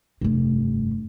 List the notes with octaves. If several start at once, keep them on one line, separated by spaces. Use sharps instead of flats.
F1 G2